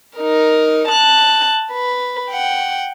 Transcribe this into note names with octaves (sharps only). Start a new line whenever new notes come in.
D#4 A#4
A5 F#6
B4
F#5 G5